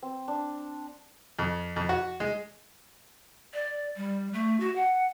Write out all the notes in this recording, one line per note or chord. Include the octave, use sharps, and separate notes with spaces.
C4
D4
F2
F2
F#4
G#3
D5
G3
A3
F#4
F#5